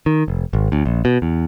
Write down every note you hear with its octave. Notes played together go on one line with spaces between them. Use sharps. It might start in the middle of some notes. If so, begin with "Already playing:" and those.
D#3
F1
G#1
D2
A#1
B2
E2